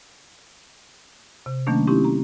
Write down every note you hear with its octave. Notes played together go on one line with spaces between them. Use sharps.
C3
D#3 F#3 A3 A#3 C#4 D4
C4 C#4 D#4 E4 G4
A#5